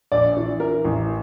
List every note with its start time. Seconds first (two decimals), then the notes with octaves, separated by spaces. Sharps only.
0.12 A#1 D5
0.37 E3
0.60 E3 A#4
0.85 A1